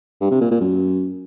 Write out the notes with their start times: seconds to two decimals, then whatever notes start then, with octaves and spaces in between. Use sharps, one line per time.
0.21 G2
0.31 C3
0.41 A#2
0.51 A#2
0.61 F#2